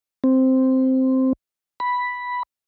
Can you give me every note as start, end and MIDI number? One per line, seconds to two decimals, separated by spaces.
0.24 1.33 60
1.80 2.43 83